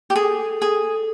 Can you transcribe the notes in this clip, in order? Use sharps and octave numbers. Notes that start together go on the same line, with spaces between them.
G4
G#4 A4
G#4 A4